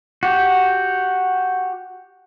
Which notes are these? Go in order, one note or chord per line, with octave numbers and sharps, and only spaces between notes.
F#4 G4